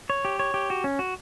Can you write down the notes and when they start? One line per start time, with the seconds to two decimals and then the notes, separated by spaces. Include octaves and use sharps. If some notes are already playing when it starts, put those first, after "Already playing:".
0.10 C#5
0.25 G4
0.39 C#5
0.54 G4
0.70 F#4
0.84 C#4
0.99 F#4